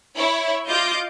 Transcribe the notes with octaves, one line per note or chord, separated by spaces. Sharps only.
E4 C#5
F4 D#5 D6 G6